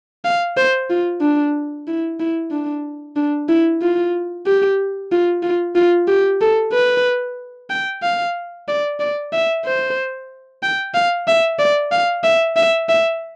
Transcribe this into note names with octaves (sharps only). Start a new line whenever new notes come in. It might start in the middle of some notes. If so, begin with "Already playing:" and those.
F5
C5
F4
D4
E4
E4
D4
D4
E4
F4
G4
F4
F4
F4
G4
A4
B4
G5
F5
D5
D5
E5
C5
G5
F5
E5
D5
F5
E5
E5
E5